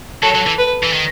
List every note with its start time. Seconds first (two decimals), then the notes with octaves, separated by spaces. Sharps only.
0.23 F#3 A4
0.35 F#3
0.46 E3
0.58 B4
0.83 E3
0.93 D#3